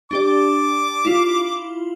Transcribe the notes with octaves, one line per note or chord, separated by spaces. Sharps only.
D4 G4 D5 D6
E4 F4